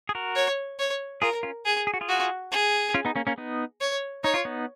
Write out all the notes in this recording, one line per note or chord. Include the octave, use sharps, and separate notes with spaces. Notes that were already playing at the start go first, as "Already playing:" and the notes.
G#4
F#4 A#4
C#5
C#5
F4 G#4 A#4
C#4 F4
G#4
G#4
F#4
F4 G#4
F#4
G#4
C#4 F4
B3 D#4
A#3 C#4
A#3 C#4
B3 D#4
C#5
D#4 C#5
F4
B3 D#4